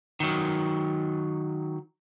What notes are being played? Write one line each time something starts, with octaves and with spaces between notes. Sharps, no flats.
D#3 F#3